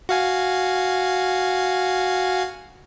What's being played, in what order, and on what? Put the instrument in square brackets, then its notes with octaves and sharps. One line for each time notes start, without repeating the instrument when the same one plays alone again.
[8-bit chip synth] F#4 F5 G#5